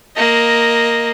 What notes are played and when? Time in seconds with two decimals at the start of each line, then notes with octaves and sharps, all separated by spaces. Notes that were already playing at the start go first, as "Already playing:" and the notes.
0.16 A#3 D#5